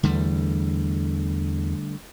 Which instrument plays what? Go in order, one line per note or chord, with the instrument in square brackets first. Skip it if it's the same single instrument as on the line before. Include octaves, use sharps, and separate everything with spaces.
[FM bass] E2 [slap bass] D3 G3 A3